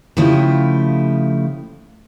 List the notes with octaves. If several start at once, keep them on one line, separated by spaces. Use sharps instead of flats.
C#3 F3 A3 D#4 E4 G4